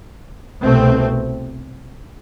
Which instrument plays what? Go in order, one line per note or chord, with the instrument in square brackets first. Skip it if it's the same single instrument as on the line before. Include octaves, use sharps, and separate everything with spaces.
[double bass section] C2 B2 A3 C4